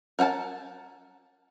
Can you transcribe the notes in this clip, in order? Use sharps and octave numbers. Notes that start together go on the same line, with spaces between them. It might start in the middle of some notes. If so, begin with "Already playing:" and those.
A#4 F#5 G5 A5